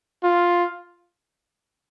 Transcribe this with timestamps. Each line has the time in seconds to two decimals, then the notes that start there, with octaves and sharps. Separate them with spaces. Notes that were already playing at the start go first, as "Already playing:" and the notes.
0.24 F4